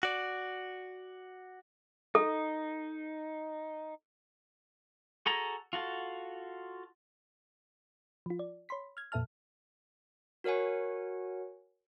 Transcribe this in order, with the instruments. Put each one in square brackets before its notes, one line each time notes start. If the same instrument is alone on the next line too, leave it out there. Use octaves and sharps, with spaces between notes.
[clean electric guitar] F#4 D5
[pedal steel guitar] D#4 [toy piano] A4
[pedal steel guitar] F#4 G#4 A4 A#5
F4 F#4 A4
[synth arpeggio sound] F3 F4
D5
C#5 B5 C6 B6
F6 G#6
F2 A#2 A4 E5 A5 F6
[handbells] F#4 A#4 C#5 F#5 G#5